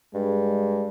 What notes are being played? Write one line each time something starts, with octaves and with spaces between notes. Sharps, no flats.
G2 G#3